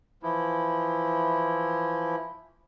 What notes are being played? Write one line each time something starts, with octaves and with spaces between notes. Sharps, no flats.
E3 F3 E4